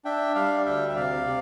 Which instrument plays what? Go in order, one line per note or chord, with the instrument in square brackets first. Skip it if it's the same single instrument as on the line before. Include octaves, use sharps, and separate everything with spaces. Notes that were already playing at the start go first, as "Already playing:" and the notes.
[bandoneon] D4 E5 G5
G3 D5 F5
D2 E5 G5
E5
C3 D5 F5
C3